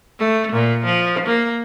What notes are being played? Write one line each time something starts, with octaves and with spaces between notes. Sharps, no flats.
A3
A#2
F3
A#3